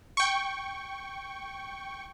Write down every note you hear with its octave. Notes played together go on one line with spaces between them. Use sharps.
G5 C#6